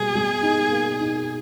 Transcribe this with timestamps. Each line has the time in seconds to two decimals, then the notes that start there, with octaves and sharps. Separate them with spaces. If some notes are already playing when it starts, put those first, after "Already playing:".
Already playing: B2 G3 A#3 G#4
0.15 G3
0.43 D#4
0.71 A#3
1.01 D#4